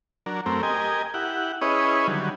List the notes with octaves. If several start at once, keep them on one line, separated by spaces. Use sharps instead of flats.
F#3 D4 A#4
F#2 A3 C4 A#4
G4 A#4 D#5 G#5
E4 G4 F#5
C#4 E4 G#4 B4 C#5 D#5
D3 D#3 F#3 G3